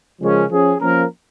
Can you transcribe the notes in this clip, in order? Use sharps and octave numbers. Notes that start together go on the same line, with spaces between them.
C#3 F3 G#3 C#4 A#4
F3 C#4 G#4
F3 A#3 C#4 A#4